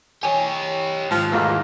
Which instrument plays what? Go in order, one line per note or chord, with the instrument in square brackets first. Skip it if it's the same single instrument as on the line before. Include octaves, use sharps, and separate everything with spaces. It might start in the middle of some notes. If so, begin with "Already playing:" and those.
[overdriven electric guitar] G4 C#5 [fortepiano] G#5
[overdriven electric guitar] G#2 D#3 [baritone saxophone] F3
[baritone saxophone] E2 [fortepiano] A3 A#3 F4